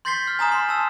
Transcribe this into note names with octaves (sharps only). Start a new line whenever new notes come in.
C6 G6 A6 B6 C7 G7
F6
G#5 A#5 D#6 E7
C6
A5 E6